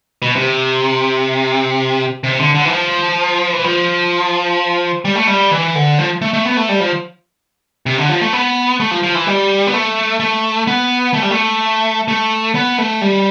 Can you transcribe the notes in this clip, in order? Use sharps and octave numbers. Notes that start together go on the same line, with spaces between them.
B2
C3
C3
D3
D3
E3
F3
E3
F3
G3
A3
G3
E3
D3
F3
A3
A3
B3
A3
G3
F3
C3
D3
F3
A3
B3
A3
F3
F3
E3
G3
B3
A3
A3
B3
A3
G3
A3
A3
B3
A3
G3